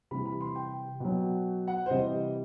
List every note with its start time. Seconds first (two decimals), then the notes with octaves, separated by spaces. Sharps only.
0.11 C3 E3 G3 B5
0.26 B5
0.41 C6
0.55 G5
1.00 B2 F#3
1.68 F#5
1.86 C5
1.90 C3 E3 G3 D#5